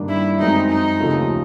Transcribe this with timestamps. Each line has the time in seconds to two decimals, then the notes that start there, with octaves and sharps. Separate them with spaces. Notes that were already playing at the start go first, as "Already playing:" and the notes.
Already playing: G2 D#3 G3 A#3 D4
0.09 E4
0.39 F#2 D#3 G#3 C4 D#4
0.70 D#4
1.00 D#2 C#3 F3 A3 C#4